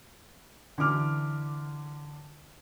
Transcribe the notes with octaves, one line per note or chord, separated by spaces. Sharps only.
D3 E3 D6 F6